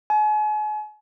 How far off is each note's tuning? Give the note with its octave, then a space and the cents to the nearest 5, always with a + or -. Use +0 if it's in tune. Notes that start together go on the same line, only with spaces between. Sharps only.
G#5 +40